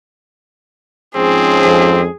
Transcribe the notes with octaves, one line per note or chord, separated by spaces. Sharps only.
G#2 F3 C4 C#4 G#4
F2